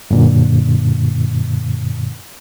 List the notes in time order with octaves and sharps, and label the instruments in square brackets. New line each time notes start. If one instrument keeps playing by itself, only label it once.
[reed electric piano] F#2 A#2 D3